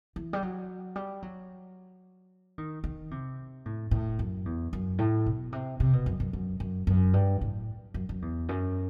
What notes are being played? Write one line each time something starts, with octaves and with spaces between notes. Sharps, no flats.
E3
G3
F#3
G3
F#3
D#3
D#3
C3
A2
A2
F#2
E2
F#2
A2
B2
C3
C3
B2
F#2
F#2
F#2
F#2
F#2
G2
A2
F#2
F#2
E2
F#2